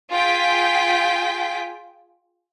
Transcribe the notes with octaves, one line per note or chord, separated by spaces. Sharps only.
F4 G#4 G5 B6